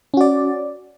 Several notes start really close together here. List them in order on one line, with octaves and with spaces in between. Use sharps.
C#4 F#4 D5